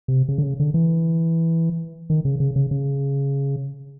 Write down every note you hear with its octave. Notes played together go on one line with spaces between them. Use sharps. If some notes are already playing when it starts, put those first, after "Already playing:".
C3
C#3
D3
C#3
D3
E3
D#3
C#3
C#3
C#3
C#3